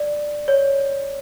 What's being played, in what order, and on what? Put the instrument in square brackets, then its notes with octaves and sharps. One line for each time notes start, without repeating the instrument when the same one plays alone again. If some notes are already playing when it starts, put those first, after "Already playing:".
Already playing: [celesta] D5
C#5